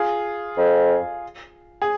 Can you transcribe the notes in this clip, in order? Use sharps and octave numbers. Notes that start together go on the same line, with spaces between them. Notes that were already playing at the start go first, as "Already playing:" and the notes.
Already playing: F4 G#4
F2
G#4